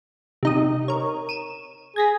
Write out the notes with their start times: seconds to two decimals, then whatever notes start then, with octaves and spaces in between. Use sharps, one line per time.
0.43 C3 D#4 D#6
0.88 A#4 C#5
1.29 D#7 E7
1.96 G#4 G#6 A#6 B6